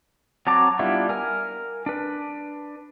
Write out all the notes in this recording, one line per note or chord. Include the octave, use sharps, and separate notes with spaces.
F#3 C4 A5 A#5 D6
G3 B3 D4 E4 F4
A#4 G#5 F6
D4 B4